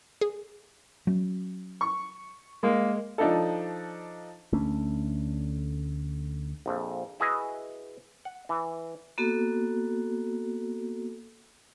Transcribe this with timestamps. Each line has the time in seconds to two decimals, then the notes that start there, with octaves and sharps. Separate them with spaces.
0.21 G#4
1.07 F#3 C#4
1.81 C#6
2.63 G#3 A#3
3.18 F3 D4 D#4 A4
4.53 D2 A3 C#4 D4
6.66 A#1 F2
7.20 E4 F#4 G#4 B4 D#5 E5
8.25 F#5
8.49 E3
9.18 A#3 B3 F#4 A4